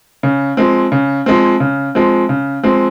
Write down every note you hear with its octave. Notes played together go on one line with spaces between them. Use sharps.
C#3
F3 G#3 C4
C#3
F3 G#3 C4
C#3
F3 G#3 C4
C#3
F3 G#3 C4